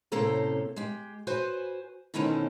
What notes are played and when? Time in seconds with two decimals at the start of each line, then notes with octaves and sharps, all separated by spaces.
0.12 A2 C3 A#3 C#4 A4 C5
0.76 G#3 G4
1.27 F#4 B4 C5 G#5
2.14 B2 D#3 E3 A3 C4 C#4